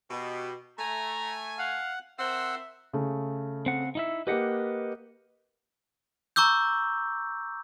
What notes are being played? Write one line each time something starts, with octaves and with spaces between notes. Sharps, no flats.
B2 G4
A3 G#5 A#5
F5 F#5
C4 A#4 C5 E5 F#5 E6
C#3 A3
C4 F#5
D#4 E4 E5
A#3 G4 B4 D#5 F#5
A#5 C#6 D6 E6 G6